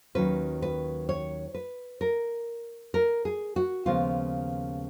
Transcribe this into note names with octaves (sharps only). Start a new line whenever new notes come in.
D#2 D#3 F#3 C#4 B4
B4
C#5
B4
A#4
A#4
G#4
F#4
D#2 C#3 F3 G#3 B3 F4